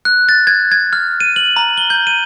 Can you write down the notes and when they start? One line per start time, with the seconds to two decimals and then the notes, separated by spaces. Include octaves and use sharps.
0.05 F#6
0.29 A6
0.47 G#6
0.72 G#6
0.93 F6
1.20 D#7
1.36 F#7
1.56 A#5
1.77 G7
1.90 G6
2.07 D#7